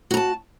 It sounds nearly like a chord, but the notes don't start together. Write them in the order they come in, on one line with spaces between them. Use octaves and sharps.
F#4 A#5 A5